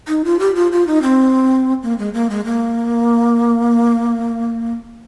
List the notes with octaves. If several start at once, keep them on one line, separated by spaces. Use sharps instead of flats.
D#4
F4
G4
F4
F4
D#4
C4
A#3
G#3
A#3
G#3
A#3